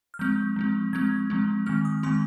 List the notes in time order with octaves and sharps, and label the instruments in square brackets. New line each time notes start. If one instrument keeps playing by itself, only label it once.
[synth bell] F6
F3 G#3 C4 G6
F3 G#3 C4
F3 G#3 C4 G#6
F3 G#3 C4
D#3 G#3 C4 F6
D#6
D#3 G#3 C4 C6